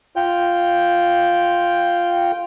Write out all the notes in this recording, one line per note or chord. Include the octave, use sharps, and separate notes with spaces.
F4 G5